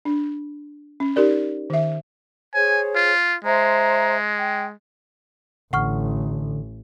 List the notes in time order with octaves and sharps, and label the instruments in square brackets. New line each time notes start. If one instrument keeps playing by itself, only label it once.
[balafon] D4
C#4
D#4 G4 A#4 D5
D#3 E5
[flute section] G#4 C5 C#5 [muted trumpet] G#5
[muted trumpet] F4
[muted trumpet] G#3 [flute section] C5 E5 A#5
[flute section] G5
[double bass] A1 [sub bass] D3 [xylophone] F#5 C#6 F6